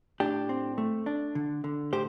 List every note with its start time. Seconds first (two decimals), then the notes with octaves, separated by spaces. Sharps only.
0.20 A2 D4 G4
0.49 C4
0.78 A3
1.06 D4
1.35 D3
1.64 D3
1.93 A2 G4 C5